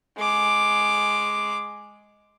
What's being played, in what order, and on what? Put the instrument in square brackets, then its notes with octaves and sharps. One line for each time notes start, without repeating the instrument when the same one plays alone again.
[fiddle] G#3 D6